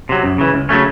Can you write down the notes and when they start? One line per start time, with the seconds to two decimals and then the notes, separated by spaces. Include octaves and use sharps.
0.09 C3 F#3
0.24 F#2
0.38 C#3 E3
0.54 C#2
0.69 C#3 F#3 A3 C#4